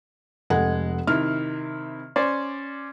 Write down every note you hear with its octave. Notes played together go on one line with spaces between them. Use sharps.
F1 G#3 A4 F#5
C3 D#3 E4 F6
C#4 C5 D5